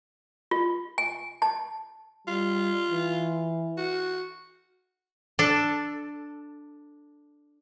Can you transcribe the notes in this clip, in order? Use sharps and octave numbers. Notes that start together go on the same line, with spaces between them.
F4
G#5
A5
G3 F4
E3
F#4
D4 A4